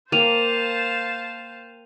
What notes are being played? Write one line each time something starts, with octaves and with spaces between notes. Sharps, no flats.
A#3 C5 F5 G5 A5 D#7 F7